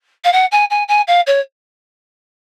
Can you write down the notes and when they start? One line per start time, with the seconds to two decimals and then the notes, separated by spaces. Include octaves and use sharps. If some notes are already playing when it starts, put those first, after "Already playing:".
0.24 F5
0.32 F#5
0.51 G#5
0.70 G#5
0.88 G#5
1.07 F5
1.26 C#5